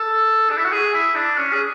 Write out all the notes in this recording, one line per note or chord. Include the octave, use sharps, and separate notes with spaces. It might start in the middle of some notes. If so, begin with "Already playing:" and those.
Already playing: A4
D4
E4
F#4
G#4
E4
D4
C#4
G#4